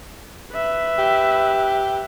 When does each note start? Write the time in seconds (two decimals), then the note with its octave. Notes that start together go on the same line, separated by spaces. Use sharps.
0.52 B4 E5
0.99 G4